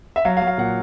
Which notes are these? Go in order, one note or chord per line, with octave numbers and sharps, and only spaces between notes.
E5
F#3 F5
F5
F#3
F5
A#2 F#5